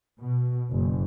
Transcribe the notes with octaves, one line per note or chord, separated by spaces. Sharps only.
B2
F#1